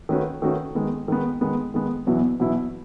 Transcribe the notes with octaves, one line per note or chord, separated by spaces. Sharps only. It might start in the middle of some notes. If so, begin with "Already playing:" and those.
D#3 A3 C#4 F#4 B4
D#3 A3 C#4 F#4 B4
D#3 G#3 B3
D#3 G#3 B3
D#3 G#3 B3
D#3 G#3 B3
E2 B2 F#3 B3 E4
E2 B2 F#3 B3 E4